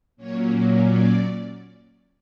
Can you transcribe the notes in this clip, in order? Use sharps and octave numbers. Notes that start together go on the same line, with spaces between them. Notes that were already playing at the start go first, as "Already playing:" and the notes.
A#2 F#3 A#3 C#4 C#5
D5